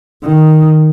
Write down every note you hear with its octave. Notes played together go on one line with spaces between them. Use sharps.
D#3